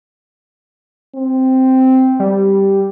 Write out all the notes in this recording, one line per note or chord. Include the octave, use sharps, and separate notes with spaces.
C4
G3